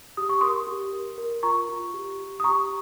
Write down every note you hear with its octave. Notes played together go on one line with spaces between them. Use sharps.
G4 D#6
C#6
A#4 C6 D#6
G4
A#4
A#4
F4 A#5 C#6
F4
G4
G4
D#6
G4 A#5 C#6